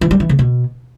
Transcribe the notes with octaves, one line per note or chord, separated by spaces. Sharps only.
E3
G3
E3
C#3
B2